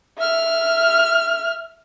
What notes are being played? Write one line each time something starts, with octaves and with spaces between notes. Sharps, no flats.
E5 F6